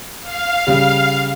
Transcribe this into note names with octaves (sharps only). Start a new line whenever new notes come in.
F5
C#3 G3